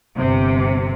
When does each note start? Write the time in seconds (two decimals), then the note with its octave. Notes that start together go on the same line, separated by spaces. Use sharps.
0.17 G1 C3